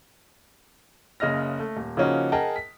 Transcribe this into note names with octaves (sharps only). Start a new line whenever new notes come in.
F#1 C#3 D#5 F6 A#6
A3
D#1
C#3 F3 A#3 C#4 D#4 F#4
G#4 A#4 D#5 F#5 G5 A5
B6